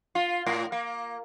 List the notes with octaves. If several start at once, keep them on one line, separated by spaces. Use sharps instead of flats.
F4
A2
A#3